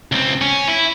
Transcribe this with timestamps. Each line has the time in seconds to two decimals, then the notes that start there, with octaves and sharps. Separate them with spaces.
0.12 C#2 C4
0.41 C#4
0.68 E4